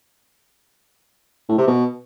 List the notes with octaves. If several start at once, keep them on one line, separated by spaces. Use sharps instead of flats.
A2
C3
B2